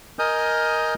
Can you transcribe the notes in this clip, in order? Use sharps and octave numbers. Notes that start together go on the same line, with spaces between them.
A#4 D#5 G#5 D#6 F6 G6